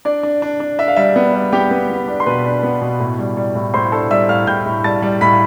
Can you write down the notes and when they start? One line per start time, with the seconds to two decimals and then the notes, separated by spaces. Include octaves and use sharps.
0.05 D4 D5
0.23 D4
0.42 D4
0.60 D4
0.79 D4 E5
0.88 F5
0.97 G3 E5
1.16 B3
1.34 G3
1.53 B3 G4 G5
1.71 B3
1.90 B3
2.08 D4
2.20 C6
2.26 B2 B4 B5
2.45 D4
2.63 B3
2.81 B2
3.00 A2
3.19 G3
3.37 G3
3.55 A2
3.74 A2 C5 C6
3.92 D4 A4 A5
4.11 G3 E5 E6
4.29 A2 F5 F6
4.47 A2 G5 G6
4.66 A2
4.84 G3 A5 A6
5.02 G3
5.21 A2 B5 B6